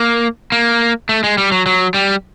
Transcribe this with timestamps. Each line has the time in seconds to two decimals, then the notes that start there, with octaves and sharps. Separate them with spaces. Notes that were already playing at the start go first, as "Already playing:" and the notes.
Already playing: A#3
0.52 A#3
1.09 A3
1.24 G#3
1.38 G3
1.52 F#3
1.66 F#3
1.94 G3